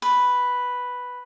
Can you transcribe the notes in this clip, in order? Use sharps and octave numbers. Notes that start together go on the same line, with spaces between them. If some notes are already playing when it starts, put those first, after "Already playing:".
B4